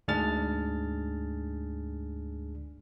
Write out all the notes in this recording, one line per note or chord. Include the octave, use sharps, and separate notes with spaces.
D2 G#2 D4 G#4 F6 A6